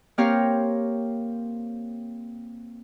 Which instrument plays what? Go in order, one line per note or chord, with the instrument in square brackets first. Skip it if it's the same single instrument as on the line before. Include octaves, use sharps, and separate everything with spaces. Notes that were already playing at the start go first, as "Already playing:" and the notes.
[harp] A#3 C4 G4 A#4 C#5 F5